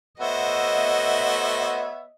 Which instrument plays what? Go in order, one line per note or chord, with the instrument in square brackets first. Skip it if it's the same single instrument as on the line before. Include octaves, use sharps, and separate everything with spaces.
[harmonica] A3 F#4 C5 [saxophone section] B3 C#5 E5 [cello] D#5